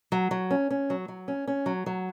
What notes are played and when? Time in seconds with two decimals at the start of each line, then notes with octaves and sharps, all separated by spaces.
0.12 F#3
0.31 F#3
0.51 C#4
0.70 C#4
0.90 F#3
1.08 F#3
1.28 C#4
1.47 C#4
1.66 F#3
1.86 F#3